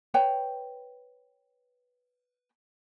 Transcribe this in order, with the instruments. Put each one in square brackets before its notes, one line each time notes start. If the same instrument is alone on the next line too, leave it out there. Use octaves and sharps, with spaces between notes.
[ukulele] B4 C#5 G5